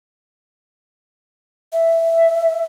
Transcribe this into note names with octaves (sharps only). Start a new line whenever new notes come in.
E5